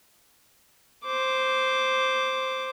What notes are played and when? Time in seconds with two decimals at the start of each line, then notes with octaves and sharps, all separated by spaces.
1.05 C5 D6